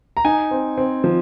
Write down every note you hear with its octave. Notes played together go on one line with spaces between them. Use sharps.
A#5
D#4 G#5
C4
C4
F3